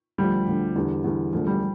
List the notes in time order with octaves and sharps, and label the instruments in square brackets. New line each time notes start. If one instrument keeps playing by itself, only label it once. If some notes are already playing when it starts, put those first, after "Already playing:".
[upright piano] D2 D3 F3 [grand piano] G3
[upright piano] D2 D3 F3
E2 D3 G3
E2 D3 G3
[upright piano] E1 D2 D3 [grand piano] F3
[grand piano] G3